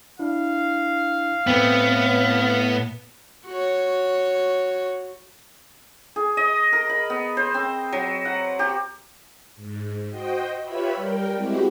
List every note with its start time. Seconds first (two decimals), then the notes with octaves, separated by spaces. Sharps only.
0.19 D4 E4 F5
1.47 A2 B3 C4 B4
3.47 F#4 C#5
6.16 G#4
6.37 D#5
6.73 A#4
6.89 B5
7.10 B3
7.37 C5
7.54 C4
7.92 F#3
8.25 F#5
8.59 G4
9.56 G#2
10.10 F#4 C5 D#5 G5
10.63 F4 G4 B4 C#5 E5 B5
10.96 G3 A#4 G5
11.34 G#3 C4 E4 F#4 G4